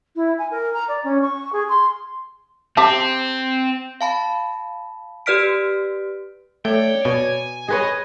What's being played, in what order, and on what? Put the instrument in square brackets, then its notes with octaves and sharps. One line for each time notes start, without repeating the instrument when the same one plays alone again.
[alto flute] E4
G#5
A#4
A#5
D5
C#4
C#6
G#4
C6
[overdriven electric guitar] C4 [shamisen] G4 E5 A5
[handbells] F5 A5 B5
G4 B4 D5 F6 B6 D7
[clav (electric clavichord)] A3 [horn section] C#5 D5 [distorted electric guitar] G5
[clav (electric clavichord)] B2 [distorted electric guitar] G#5
[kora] G#4 B4 C#5 [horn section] D#5